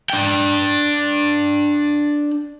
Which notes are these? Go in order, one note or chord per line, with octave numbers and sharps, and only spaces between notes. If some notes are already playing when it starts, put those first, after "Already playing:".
D4 G5